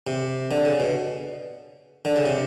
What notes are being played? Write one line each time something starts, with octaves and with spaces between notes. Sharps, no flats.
C3
D3
C#3
B2
D3
C#3
C3